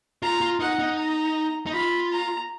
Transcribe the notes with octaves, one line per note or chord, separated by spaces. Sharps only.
F4 A#5
F4
D#4 F#5
D#4
A#5
D#4
F4 B5
A#5